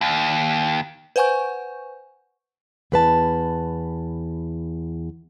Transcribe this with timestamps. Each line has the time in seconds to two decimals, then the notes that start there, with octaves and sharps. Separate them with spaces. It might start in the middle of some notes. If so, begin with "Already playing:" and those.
0.01 D#2
1.16 B4 C5 F#5 G#5 C#6 G6
2.92 E2 B4 A5